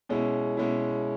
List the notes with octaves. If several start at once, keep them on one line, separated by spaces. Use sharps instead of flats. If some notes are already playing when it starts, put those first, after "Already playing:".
B2 G#3 C#4 E4
B2 G#3 C#4 E4